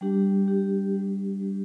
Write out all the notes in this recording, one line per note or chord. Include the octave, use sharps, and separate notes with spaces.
G3 D4 G4
G3 D4 G4
G3 D4 G4
G3 D4 G4